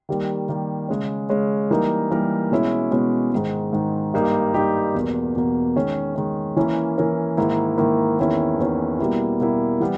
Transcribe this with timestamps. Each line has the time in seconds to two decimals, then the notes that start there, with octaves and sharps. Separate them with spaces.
0.09 D#3 G3 A#3
0.49 D#3 G3 A#3
0.89 C#3 G#3 C#4
1.29 C#3 G#3 C#4
1.71 E3 G3 A#3 D#4 A#4
2.11 E3 G3 A#3 D#4 A#4
2.51 B2 G#3 C#4 E4
2.91 B2 G#3 C#4 E4
3.32 G#2 D#3 G#3
3.73 G#2 D#3 G#3
4.14 G2 G3 A#3 D#4 G4
4.54 G2 G3 A#3 D#4 G4
4.95 E2 B2 A#3
5.36 E2 B2 A#3
5.76 D#3 G#3 C#4
6.16 D#3 G#3 C#4
6.56 E3 A#3 C#4 E4 A#4
6.98 E3 A#3 C#4 E4 A#4
7.37 G#2 D#3 A#3 E4
7.78 G#2 D#3 A#3 E4
8.19 E2 D#3 A#3 C#4 E4
8.59 E2 D#3 A#3 C#4 E4
8.99 B2 G3 A#3 E4
9.40 B2 G3 A#3 E4
9.80 E3 G3 B3